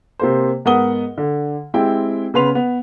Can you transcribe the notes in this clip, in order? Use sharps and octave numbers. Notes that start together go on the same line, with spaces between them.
C3 A#3 C5
G#2 B3 A#4 F#5 D#6 G7
D3
G#3 C4 E4 G4 G5
C#3 B3 B4 C6 F7
B3